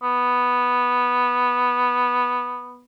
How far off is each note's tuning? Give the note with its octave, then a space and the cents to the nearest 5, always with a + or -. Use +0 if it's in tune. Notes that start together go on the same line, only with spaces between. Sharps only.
B3 -5